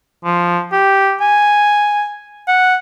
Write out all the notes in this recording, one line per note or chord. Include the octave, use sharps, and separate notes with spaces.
F3
G4
G#5
F#5